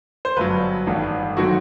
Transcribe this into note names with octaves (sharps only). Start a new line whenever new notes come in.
C5
G1 G2 F#3 B4
A1 G2 D#3 A3
D#3 F#3 A3 C4 F#4